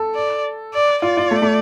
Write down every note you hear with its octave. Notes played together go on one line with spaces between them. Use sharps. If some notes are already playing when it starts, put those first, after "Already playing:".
Already playing: A4
D5
D5
F4 D5
F4
A3
A3